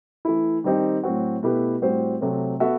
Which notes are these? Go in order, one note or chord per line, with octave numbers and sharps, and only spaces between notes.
E3 A3 E4
D#3 G3 C4 D#4 G4
A2 F#3 C4 F#4
B2 A3 E4 G4 B4
A2 G3 C4 F#4 C5
C3 F#3 A3 C4
B3 F#4 A4 E5